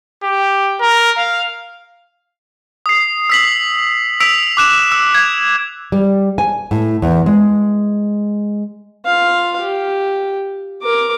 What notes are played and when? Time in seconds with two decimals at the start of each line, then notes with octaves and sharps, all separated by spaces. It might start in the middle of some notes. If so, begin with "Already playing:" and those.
0.23 G4
0.81 A#4
1.18 F5
2.86 D#6 C7
3.30 E6 B6 F#7
4.20 E6 B6 D7 F7
4.57 D6 F#6 E7
4.92 E6
5.14 G#6
5.92 G3
6.38 G#5
6.71 A2
7.02 E2
7.26 G#3
9.05 F4 F5
9.61 G4
10.82 A#4 D6